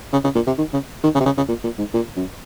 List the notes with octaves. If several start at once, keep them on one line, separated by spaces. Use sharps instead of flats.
C#3
C#3
A#2
C3
D#3
C#3
D#3
C#3
C3
C#3
C#3
A#2
A#2
G#2
A#2
F#2